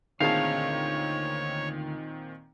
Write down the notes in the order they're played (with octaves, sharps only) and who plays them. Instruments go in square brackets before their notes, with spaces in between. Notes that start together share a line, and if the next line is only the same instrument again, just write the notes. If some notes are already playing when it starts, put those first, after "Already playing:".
[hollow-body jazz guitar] D2 G#4 A5 [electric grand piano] A#2 D#3 C4 [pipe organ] C#5 [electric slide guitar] F5